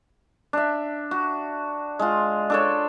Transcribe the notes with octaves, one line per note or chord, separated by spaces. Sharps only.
D4 E5
F#4
G#3 F4
D4 A4 C#5